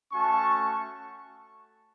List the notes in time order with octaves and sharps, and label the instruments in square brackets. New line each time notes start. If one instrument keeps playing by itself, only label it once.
[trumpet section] A3 C#4 F#4 A5 C#6